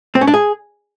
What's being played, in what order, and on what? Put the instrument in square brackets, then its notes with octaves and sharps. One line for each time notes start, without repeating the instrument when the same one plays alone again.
[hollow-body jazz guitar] C4
C#4
D4
G#4